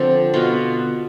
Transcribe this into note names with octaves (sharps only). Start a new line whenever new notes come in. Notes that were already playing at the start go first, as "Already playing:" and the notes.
Already playing: D3 F3 C4
B2 B3 F4